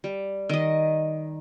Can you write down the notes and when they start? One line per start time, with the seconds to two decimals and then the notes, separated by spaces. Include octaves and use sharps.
0.04 G3
0.49 D#3 D#5